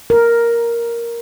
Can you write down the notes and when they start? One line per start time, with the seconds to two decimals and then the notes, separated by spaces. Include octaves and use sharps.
0.10 A#4